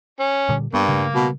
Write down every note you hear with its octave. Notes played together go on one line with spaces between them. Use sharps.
C#4
A#2 D3 G3
G2 A#3 B3
C#3 G3 A3
B2